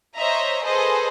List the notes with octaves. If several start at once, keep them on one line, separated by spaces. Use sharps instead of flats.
C5 C#5 D#5 E5 A#5
G#4 A4 B4 C5 D#5